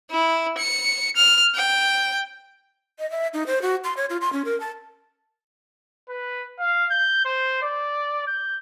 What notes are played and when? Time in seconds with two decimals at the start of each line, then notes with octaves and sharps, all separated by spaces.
0.10 E4
0.58 C#7
1.16 F6
1.55 G5
2.98 D#5
3.11 E5
3.34 D#4
3.47 C5
3.62 F#4
3.84 C6
3.97 C#5
4.10 F4
4.21 C6
4.33 C#4
4.45 A#4
4.60 A5
6.09 B4
6.59 F5
6.91 G6
7.25 C5
7.62 D5
8.27 G6